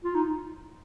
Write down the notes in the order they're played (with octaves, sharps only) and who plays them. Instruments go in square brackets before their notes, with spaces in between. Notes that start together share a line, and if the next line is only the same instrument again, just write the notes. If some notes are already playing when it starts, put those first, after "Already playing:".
[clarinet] F4
D#4